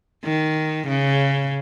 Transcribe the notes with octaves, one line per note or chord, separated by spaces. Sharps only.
D#3
C#3